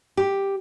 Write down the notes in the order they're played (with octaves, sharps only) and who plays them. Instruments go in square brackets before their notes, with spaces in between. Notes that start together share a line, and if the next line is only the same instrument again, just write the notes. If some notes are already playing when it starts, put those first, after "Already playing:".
[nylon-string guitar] G4